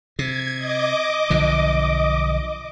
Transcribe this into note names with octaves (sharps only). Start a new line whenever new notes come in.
C3 G#6
D#5 D6
B1 D3 F3